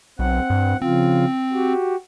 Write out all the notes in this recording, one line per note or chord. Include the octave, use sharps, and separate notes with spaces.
B1 C4 F#5
G2
C#3 F3 C4 F4
F#4 G4